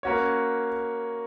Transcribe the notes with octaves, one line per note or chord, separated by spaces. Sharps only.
A#3 C#4 F#4 C#5